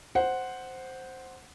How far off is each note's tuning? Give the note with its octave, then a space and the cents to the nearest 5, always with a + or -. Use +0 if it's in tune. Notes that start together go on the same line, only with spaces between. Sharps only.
C5 +0 F#5 +0